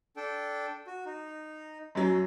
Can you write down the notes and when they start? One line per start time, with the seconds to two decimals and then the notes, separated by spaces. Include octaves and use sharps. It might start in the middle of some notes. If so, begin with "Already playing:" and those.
0.17 D4 A4 G5
0.87 F#4
1.06 D#4
1.95 F#2 F#3